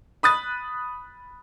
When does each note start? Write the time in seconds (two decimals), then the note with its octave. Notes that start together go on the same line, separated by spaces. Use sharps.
0.23 B5 D#6 F#6 A6